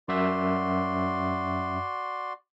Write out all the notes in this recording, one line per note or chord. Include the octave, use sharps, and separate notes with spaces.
F#2 F#4 D5 E5 C6